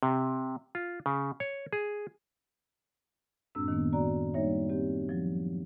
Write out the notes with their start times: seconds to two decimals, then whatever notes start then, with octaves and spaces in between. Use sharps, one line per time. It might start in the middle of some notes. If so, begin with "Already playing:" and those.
0.03 C3
0.75 F4
1.06 C#3
1.40 C#5
1.73 G#4
3.55 F#2 A2 G#3 C4 D4 E6
3.68 D#3 A#3 B3
3.93 F#4 D5 A#5
4.34 G3 A#3 D#4 C#5 E5
4.69 C4 G4
5.09 F3 F#3